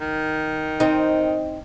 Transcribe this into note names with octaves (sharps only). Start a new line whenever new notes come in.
D#3
C4 D#4